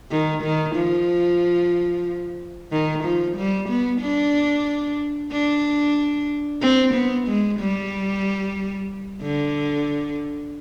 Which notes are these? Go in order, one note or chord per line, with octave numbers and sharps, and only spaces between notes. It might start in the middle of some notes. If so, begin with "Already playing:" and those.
D#3
D#3
F3
D#3
F3
G3
B3
D4
D4
C4
B3
G#3
G3
D3